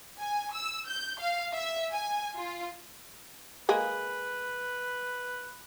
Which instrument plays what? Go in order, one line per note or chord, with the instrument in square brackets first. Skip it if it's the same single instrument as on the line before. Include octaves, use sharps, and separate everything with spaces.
[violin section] G#5
E6
G6
F5
E5
G#5
F4
[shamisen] G#3 A#3 G#4 [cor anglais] B4